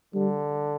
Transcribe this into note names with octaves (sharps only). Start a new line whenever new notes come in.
D3 G3